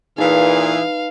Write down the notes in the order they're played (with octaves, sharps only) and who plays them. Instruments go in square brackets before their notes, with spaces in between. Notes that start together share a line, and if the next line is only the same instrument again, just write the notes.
[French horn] A#2 [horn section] E3 G#4 [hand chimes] D#4 B4 [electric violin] F5